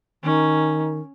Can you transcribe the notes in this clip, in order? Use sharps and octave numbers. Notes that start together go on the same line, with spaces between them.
D#3 C#4